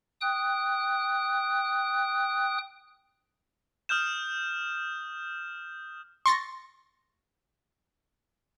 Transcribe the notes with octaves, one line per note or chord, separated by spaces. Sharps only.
G5 D#6 F#6
D#6 F6 G6 E7
C6 C#6 A6 A#6